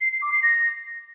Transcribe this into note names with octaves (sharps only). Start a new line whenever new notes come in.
C7
C7
D6
C7
A#6